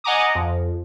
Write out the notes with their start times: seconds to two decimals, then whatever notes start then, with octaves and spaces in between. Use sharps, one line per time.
0.04 D#5 F#5 G#5 A#5 D6 D#6
0.35 F2